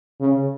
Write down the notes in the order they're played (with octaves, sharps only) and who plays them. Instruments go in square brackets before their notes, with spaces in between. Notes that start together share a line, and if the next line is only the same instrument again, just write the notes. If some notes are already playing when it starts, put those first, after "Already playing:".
[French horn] C#3